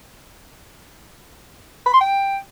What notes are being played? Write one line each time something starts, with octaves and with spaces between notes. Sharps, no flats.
B5
C6
G5